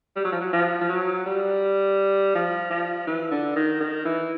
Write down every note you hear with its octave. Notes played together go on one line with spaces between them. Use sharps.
G3
F#3
F3
F#3
F3
F3
F#3
G3
F3
F3
E3
D3
D#3
D#3
E3